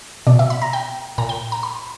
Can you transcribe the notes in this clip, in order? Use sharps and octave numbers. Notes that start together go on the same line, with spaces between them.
B2 D5
E5
B5
A#5
G5
A#2 A#5
G5
A#5
B5